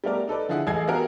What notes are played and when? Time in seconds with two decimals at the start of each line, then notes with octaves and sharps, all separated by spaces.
0.04 G3 A3 B3 A#4 D5
0.28 D#4 A4 B4 D5
0.49 D3 F3 E4 G#4 F#5
0.67 A1 G#4 A4 D#5 G#6 C7
0.87 B3 F#4 G4 A#4 F#5